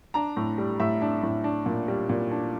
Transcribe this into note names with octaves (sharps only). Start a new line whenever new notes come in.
D4 A#5
A2
G3
A2 E5
D4
A2
D4
A#2
G3
A#2
D4